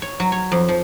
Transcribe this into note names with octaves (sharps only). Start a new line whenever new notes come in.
C#5
F#3
C#5
F2
F3